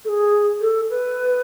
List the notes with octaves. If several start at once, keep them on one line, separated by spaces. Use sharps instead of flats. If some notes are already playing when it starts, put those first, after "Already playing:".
A4
G#4
A4
B4